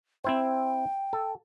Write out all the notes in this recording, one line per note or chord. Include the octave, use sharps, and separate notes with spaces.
C4 E4 C5 G5
A4